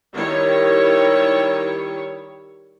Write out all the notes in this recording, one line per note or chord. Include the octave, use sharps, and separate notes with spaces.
D#3 G3 E4 C#5